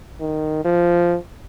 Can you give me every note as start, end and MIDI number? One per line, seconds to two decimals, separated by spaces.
0.20 0.64 51
0.65 1.18 53